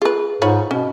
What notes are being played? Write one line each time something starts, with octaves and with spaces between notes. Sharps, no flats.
F4 G#4 B4
G#2 F4 C#5 B5
B2 C#4